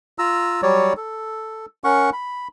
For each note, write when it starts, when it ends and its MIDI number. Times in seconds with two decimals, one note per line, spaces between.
0.19 0.61 65
0.19 0.61 82
0.19 0.61 88
0.63 0.93 54
0.63 0.93 55
0.63 0.93 73
0.63 0.93 74
0.97 1.66 69
1.84 2.10 61
1.84 2.10 70
1.84 2.10 78
1.84 2.10 85
2.13 2.48 83